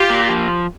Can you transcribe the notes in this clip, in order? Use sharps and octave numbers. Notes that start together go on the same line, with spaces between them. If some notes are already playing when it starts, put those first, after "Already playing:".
Already playing: F4 G4
A#3
F3